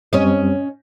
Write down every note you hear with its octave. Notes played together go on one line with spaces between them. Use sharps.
F#2 G3 C4 C#4 D#5